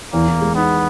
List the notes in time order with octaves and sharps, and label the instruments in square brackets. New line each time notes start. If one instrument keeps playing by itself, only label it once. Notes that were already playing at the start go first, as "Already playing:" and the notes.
[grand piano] E2 [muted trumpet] A#3
[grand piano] E2
G#3
[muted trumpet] B3 [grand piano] D#4